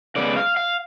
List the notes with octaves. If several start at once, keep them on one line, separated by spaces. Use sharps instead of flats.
C#3 G#3 B3 D5
F5
F5